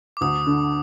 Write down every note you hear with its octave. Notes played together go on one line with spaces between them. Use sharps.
D6
D2 D#6
D3 D#6